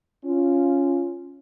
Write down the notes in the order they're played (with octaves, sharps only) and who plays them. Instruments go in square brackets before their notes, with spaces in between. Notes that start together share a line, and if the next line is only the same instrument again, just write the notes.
[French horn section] C#4 F4